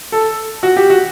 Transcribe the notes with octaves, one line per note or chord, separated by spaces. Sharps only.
A4
F#4
G4
F#4